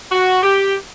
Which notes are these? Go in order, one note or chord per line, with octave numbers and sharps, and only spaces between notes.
F#4
G4